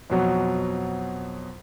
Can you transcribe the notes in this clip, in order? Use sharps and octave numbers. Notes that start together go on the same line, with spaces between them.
F2 B2 F#3